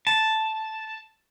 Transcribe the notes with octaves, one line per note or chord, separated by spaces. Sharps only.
A5